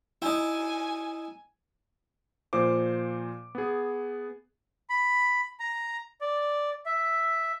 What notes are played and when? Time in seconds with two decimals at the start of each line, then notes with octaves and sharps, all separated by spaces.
0.22 D#4 E4 G#5
2.53 A#2 F3 C5 D6
3.55 B3 G#4
4.90 B5
5.60 A#5
6.21 D5
6.86 E5